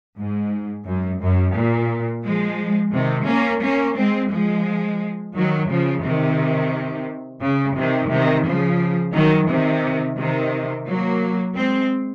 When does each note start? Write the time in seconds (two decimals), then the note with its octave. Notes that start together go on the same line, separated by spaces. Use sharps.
0.18 G#2
0.87 F#2
1.21 F#2
1.55 A#2
2.24 F3 G#3
2.93 C3 D#3
3.28 A#3 C#4
3.63 A#3 C#4
3.97 G#3 C4
4.32 F3 G#3
5.36 D#3 F#3
5.70 C#3 F3
6.04 C3 D#3
7.42 C#3
7.77 C3 D#3
8.10 C3 D#3
8.45 C#3 F3
9.14 D#3 F#3
9.48 C3 D#3
10.18 C3 D#3
10.87 F#3 A#3
11.56 G#3 C4